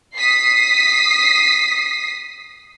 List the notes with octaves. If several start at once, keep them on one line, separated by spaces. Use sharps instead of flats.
D#6 B6 C7